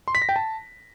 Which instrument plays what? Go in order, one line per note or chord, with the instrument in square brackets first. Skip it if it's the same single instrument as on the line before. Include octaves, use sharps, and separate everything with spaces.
[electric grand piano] C6
B6
A#6
G5
A5